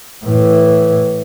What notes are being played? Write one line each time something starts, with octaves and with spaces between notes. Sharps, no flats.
A2 E3